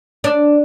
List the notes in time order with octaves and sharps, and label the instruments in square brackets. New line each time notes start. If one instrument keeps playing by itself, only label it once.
[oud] D4